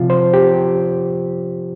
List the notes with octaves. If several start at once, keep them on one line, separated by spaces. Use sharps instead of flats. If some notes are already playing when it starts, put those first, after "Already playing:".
Already playing: C3 F3 F4
C5
G4